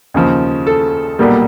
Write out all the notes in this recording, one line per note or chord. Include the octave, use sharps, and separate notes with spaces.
D#2 C#3 F3
A4
B1 A#2 G3 A#3